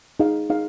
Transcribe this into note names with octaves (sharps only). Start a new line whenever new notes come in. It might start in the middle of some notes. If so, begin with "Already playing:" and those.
D#4 G#4 F5
D#4 G#4 F5